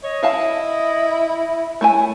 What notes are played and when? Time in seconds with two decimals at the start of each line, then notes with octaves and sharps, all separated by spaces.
0.03 C#5 D#5
0.23 E4 E5 F5 A5
1.81 A3 E4 C#5 G#5